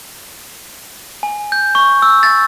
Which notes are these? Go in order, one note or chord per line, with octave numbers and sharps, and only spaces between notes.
G#5
G6
C#6
E6
A6